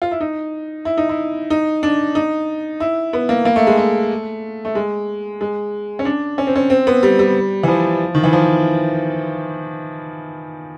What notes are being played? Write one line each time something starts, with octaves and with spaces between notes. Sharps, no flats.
F4
E4
D#4
E4
D#4
E4
D#4
D4
D#4
E4
B3
A#3
A#3
A3
G#3
A3
A3
G#3
G#3
C#4
D4
C#4
C4
C#4
C4
B3
G3
G3
E3
F3
D#3
E3
F3